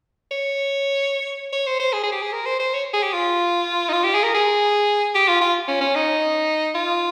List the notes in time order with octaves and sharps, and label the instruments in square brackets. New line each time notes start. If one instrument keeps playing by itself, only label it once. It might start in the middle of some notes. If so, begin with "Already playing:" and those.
[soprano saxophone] C#5
C#5
C5
C5
G#4
G#4
G4
G#4
A#4
C5
C5
C#5
G#4
G4
F4
D#4
F4
G4
G#4
A#4
G#4
G4
F4
F4
C#4
C#4
D#4
F4